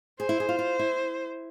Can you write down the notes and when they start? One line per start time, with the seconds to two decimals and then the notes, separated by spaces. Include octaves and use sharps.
0.20 G#4 C5
0.29 E4
0.40 G#4
0.49 F4
0.59 F4
0.79 E4